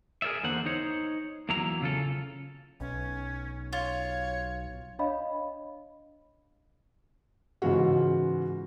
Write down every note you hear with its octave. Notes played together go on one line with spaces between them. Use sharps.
G#4 A#4 C#5 D5 E5
E2 D3 A#3 C5 F#5
D#4 C5 C#5
E2 F#3 A#3 E4 A#5
C#3 F4 A4
B1 C#4
F4 C#5
D4 C#5 D#5 F5 B5
G#2 C#3 E3 F4 F#4